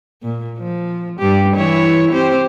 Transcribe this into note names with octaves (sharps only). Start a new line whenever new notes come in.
A#2
F3
G2 G3 G4
E3 E4 C#5
C4 G4 C5